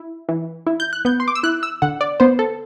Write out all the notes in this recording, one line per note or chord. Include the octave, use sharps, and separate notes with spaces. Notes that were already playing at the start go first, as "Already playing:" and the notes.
Already playing: E4
E3
E4
G6
F#6
B3 G6
C6
D6
E6
E4 F#6
E6
D3 F#5
D5
B3 C5
A4